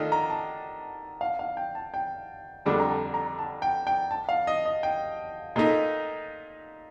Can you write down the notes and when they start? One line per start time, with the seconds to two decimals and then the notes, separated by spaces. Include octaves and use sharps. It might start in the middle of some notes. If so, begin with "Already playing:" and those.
Already playing: D#3 A3 D4 F4 D#5
0.12 A#5
0.30 A5
1.21 F5
1.39 F5
1.57 G5
1.75 A5
1.94 G5
2.65 F2 D3 G3 D4 A5
2.80 A#5
2.90 A5
3.14 A#5
3.39 A5
3.62 G5
3.87 G5
4.11 A5
4.29 F5
4.47 D#5
4.65 D#5
4.83 G5
5.56 A#2 A3 D#4 D#5